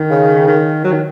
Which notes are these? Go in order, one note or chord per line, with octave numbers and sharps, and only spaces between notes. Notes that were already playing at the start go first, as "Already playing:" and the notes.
Already playing: D#3
C#3
D#3
F#3
D#3